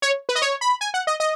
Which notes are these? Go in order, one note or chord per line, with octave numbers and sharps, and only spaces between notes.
C#5
B4
D#5
C#5
B5
G#5
F#5
D#5
D#5